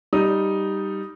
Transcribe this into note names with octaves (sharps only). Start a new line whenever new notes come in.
G3 D#4 D#6